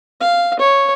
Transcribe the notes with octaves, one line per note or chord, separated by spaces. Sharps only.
F5
C#5